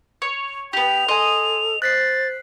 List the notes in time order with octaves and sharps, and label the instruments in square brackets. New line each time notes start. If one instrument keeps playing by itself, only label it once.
[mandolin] C#5
[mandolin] B3 G4 [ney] G5 [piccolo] F7
[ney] A4 [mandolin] D#5 [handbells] G#5 C6
[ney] C5 [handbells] F#6 B6 C7 [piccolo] A6